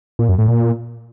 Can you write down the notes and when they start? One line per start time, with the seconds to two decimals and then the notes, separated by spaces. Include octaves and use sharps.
0.19 A#2
0.29 F#2
0.38 A2
0.48 A#2